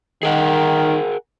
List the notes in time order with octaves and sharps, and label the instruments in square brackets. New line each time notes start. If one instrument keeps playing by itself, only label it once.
[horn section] D#3 [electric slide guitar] G#4 A#4 F#5